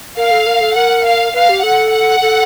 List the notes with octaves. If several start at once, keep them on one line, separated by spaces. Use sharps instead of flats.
A#4 F5
A4
A#4
A4
A#4 F#5
F5
B4 F5
G4
A4 F#5
F#5
A4